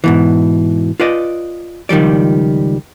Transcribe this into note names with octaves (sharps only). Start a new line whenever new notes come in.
G#2 B2 E3
F4 B4 D5 D#5
C#2 D#3 F3 G3 D5